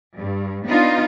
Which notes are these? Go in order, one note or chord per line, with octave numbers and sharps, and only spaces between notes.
G2
B3 D4 D#4 F4